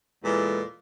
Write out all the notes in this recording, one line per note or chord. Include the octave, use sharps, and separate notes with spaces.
E2 A#2 E3 G#3 A4 B4